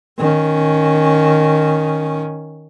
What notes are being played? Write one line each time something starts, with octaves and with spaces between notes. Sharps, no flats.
D#3 C#4